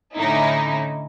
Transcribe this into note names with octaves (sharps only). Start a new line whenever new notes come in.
A2 D3 C#4 D#4 E4